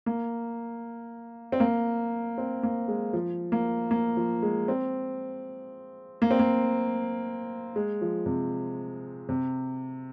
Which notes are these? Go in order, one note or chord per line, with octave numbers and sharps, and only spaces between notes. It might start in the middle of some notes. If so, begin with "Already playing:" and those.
A#3
C4
A#3
C4
A#3
G#3
F3
A#3
A#3
F3
G#3
C4
A#3
C4
A#3
G#3
F3
C3
C3